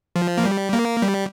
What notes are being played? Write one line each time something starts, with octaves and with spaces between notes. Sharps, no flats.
F3
A#3
G3
A#3
G3